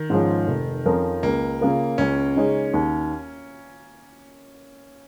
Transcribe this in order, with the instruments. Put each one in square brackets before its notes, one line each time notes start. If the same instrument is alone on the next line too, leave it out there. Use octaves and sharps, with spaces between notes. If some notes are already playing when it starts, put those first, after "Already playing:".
Already playing: [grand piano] D#3
[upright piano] G#2 F3 C#4
F1
F2 F3 C#4 A#4
[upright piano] C#2 [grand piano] A#3
[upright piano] C#3 A#3 F4 A#4
[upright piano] C#2 [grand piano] C#4
[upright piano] C#3 G#3 D#4 C#5
D#2